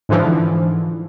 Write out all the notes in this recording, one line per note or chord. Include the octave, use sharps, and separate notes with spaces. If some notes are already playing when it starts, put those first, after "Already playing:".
G#2 D3 E3 F3